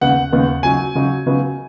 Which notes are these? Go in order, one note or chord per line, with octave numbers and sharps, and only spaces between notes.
D#2 C#3 B3 D#4 F#5
D#2 C#3 B3 D#4
C#3 F#3 D#4 G#5
C#3 F#3 D#4
C#3 F#3 B3 D#4